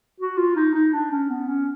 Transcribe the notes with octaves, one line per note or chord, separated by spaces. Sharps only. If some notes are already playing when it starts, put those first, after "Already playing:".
F#4
F4
D#4
D#4
D4
C#4
B3
C#4